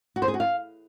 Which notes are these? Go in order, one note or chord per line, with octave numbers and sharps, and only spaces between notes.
F#4
C5
G#4
F#4
F5